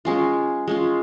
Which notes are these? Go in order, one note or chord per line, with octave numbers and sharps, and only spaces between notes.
G#3 C#4 F4
G#3 C#4 F4